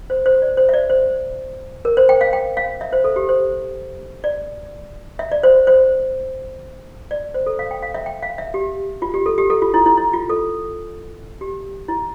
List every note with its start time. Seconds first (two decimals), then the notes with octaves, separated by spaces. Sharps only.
0.10 C5
0.26 C5
0.42 D5
0.57 C5
0.69 E5
0.74 D5
0.90 C5
1.85 A#4
1.97 C5
2.09 G5
2.21 F5
2.33 G5
2.57 F5
2.81 E5
2.93 C5
3.04 A4
3.16 G4
3.29 C5
4.24 D5
5.19 E5
5.32 D5
5.43 C5
5.67 C5
7.11 D5
7.34 C5
7.46 A4
7.59 F5
7.71 G5
7.83 F5
7.94 E5
8.06 G5
8.22 F5
8.38 E5
8.54 G4
9.02 F4
9.14 G4
9.26 A4
9.38 G4
9.50 A4
9.62 F4
9.74 E4
9.86 E4
9.97 E4
10.13 F4
10.29 A4
11.41 G4
11.88 E4